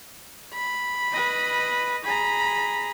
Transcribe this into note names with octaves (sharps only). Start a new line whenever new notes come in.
B5
B4 D#5
G#4 A#5 B5